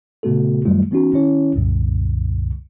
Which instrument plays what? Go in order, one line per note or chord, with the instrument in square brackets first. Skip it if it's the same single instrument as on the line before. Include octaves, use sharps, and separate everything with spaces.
[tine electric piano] A#2 C#3 A3 B3 F#4 A4
F#2 D#3 F#3 G3 A3 F4
E3 B3 C#4 D#4 F#4
D#3 C#4 E4 C#5
C2 F#2 A#2 D3